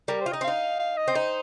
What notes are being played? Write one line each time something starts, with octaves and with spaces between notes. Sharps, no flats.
G3 A#4
C5
F4
D#4 D#5
C4
D#4 F5
F5
D#5
C4
D#4 C5